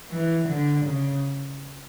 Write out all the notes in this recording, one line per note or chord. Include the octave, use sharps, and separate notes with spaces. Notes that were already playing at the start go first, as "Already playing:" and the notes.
E3
D3
C#3